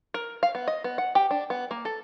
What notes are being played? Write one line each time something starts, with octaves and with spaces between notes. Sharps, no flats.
A#4
F5
B3
D#5
B3
F#5
G4
D4
B3
A#3
A4